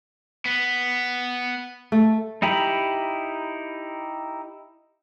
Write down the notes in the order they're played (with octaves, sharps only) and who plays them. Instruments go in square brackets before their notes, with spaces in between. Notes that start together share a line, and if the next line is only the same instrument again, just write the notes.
[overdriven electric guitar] B3
[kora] A3
[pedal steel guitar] D#4 E4 G4 A#5 B5